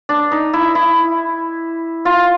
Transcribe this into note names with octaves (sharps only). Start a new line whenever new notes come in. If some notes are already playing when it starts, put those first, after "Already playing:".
D4
D#4
E4
E4
F4